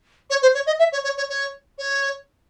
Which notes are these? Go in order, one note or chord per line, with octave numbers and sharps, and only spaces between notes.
C#5
C5
C#5
D#5
E5
C#5
C#5
C#5
C#5
C#5